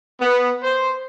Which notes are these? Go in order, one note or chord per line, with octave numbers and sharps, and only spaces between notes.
B3
C5